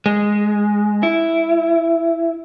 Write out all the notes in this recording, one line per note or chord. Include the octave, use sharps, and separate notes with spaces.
G#3
E4